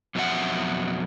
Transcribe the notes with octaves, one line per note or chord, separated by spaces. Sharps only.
F2 B2 F#3 D4 E5 F#5